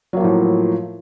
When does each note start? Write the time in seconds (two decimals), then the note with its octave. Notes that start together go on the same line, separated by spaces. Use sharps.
0.13 F#3
0.17 A#3
0.20 F3
0.24 A2